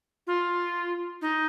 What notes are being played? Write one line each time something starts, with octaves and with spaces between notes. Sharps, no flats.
F4
D#4